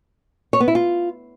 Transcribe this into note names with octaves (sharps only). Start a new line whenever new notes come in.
C#5
B3
E4
F4